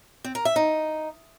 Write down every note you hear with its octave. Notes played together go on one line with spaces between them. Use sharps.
C4
A#4
E5
D#4